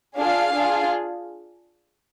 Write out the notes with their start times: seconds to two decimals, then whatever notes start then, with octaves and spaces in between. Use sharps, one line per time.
0.17 D4 F4 G#4 F5
0.53 D4 F4 G#4